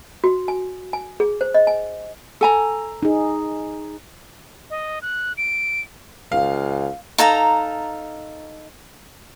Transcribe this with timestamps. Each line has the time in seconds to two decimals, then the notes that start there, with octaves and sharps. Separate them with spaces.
0.24 F#4
0.48 G#5
0.93 G#5
1.20 G#4
1.41 C5
1.54 D#5
1.67 G#5
2.41 A4 G#5 A#5
3.03 D#4 G#4
4.70 D#5
5.02 F#6
5.37 D7
6.32 C#2 F5
7.18 D#4 A4 F5 A#5